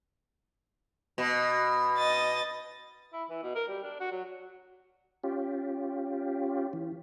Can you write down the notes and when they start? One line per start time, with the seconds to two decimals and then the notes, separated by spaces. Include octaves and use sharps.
1.18 B2
1.97 D#5 A6
3.13 E4
3.30 E3
3.43 B2
3.55 A#4
3.68 G3
3.83 D4
4.00 F#4
4.12 F#3
5.24 C#4 F4 G4
6.73 E3